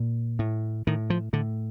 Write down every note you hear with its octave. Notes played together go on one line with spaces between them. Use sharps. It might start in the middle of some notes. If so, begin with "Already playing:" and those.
Already playing: A#2
A2
A2 D#3
F3
A2 D3